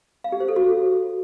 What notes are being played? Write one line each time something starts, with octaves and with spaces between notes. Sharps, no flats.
F5
G4
C5
A4
F#4